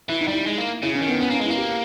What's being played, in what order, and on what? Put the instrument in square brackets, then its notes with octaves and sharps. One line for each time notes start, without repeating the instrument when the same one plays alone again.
[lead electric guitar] E3 [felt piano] E4
[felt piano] D#4
[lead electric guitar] G3 [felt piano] E4
[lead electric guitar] G#3
A#3
[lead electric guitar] C#3 [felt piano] E4
[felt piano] C#4
[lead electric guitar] D#3
[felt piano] B3
[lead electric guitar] B3 [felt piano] C#4
[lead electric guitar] A#3 [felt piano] C#4
[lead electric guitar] G#3
[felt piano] E4
[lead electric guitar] A#3
[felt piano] G4